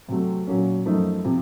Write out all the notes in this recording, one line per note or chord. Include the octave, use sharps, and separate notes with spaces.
C3 F#3 A3
A#2 F#3 A#3 C#4
F#2 F3 A3 D#4
C3 F3 C4